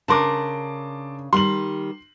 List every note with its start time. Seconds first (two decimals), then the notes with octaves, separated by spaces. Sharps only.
0.08 C#3 D4 A#4 A5 C6 D6
1.33 D#3 G3 C6 F#7